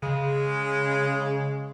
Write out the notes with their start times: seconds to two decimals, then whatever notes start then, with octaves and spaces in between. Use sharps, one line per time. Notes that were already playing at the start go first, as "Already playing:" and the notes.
0.02 C#3 G#3